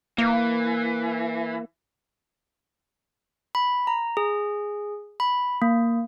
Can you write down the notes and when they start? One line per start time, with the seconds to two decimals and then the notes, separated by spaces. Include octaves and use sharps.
0.18 E3 A#3
3.55 B5
3.87 A#5
4.17 G#4
5.20 B5
5.62 A#3